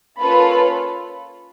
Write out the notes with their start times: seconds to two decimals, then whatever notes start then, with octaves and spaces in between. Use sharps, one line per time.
0.19 A#3 C#4 F4 A4 B4 B5